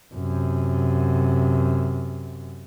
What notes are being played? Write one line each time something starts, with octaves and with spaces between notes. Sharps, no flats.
F#2 C3